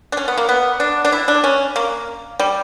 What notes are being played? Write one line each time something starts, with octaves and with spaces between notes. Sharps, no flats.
D4
C#4
B3
A#3
B3
D4
D4
E4
D4
C#4
A#3
G3